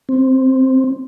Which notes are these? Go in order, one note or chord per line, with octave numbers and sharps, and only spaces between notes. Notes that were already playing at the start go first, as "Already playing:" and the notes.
C4